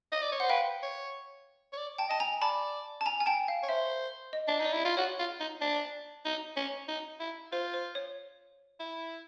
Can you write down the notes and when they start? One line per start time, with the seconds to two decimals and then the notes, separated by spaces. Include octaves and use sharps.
0.12 D#5
0.22 D5
0.32 C#5
0.40 C5 F#5
0.49 B4 F5 G5
0.82 C#5
1.73 C#5
1.77 D5
1.98 G5 A5
2.09 D#5 A5
2.20 G#5 A#5
2.41 D5 A5 B5
3.01 A5
3.06 G#5 A#5
3.20 G#5
3.26 G5 A5
3.48 F5
3.63 C#5
3.69 C5 E5
4.33 D#5
4.48 D4
4.60 D#4 D5
4.73 E4
4.85 F4
4.97 F#4 C#5
5.19 F4
5.40 D#4
5.61 D4
6.25 D#4
6.56 C#4
6.88 D#4
7.20 E4
7.52 F4 C5
7.74 C5
7.95 C#5
8.80 E4